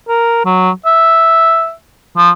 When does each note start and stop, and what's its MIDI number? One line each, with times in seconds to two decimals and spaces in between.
0.08 0.42 70
0.45 0.70 54
0.86 1.72 76
2.18 2.30 53